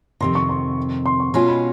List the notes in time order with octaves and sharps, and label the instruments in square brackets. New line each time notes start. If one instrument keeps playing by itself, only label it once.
[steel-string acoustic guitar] F2 C3 D#3 [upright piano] C6
[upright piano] C#6
C6
C6
C#6
[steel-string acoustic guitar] B2 G#3 C#4 F4 [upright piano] C6
[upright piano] B5